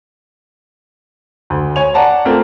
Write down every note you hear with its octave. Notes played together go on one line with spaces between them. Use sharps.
D2
C#5 G#5 F7
D5 F#5 A5 A#5
A3 A#3 C4 F4